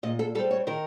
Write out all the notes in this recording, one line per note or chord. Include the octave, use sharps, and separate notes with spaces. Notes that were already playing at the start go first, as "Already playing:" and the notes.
A#2 D#5
A4
G3 C4 A4
C#5
D#3 A#4